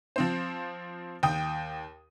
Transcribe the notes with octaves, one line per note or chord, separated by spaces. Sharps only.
F3 C4 C5
D#2 G5 D#6